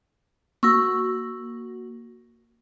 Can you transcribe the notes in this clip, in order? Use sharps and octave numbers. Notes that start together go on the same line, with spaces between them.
A#3 F#4 C#6 E6 A#6